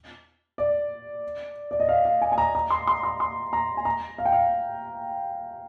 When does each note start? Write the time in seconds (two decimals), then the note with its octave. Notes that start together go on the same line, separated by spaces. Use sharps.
0.58 D5
1.71 D5
1.80 D#5
1.89 F5
2.05 F5
2.21 G#5
2.32 G#5
2.38 A#5
2.55 A#5
2.70 C6
2.87 C6
3.03 C6
3.20 C6
3.53 A#5
3.77 G#5
3.85 A#5
4.18 F5
4.25 G5
4.33 F5